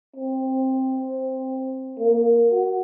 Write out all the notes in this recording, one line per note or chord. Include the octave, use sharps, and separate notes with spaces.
C4
A#3
F#4